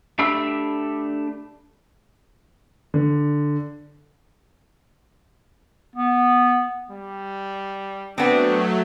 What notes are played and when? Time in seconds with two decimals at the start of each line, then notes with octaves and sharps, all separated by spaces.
0.19 A3 D4 G4 B5 E6
2.94 D3
5.96 B3
6.91 G3
8.18 F#3 A3 B3 C4 D4